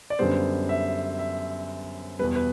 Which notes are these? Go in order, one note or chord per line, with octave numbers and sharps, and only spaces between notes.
D5
F#2 D3 G3 B3 C5
E5
E5
E2 B2 G3 B4
B4